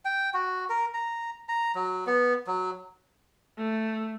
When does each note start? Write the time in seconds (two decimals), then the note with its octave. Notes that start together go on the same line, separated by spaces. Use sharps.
0.05 G5
0.34 F#4
0.70 A#4
0.94 A#5
1.48 A#5
1.75 F#3
2.07 B3
2.47 F#3
3.58 A3